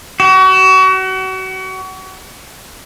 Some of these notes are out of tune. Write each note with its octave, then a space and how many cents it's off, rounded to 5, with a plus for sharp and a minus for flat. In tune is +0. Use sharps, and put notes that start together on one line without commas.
F#4 +30